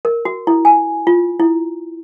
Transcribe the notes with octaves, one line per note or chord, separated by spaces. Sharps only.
A#4
F#4
E4
G#5
F4
E4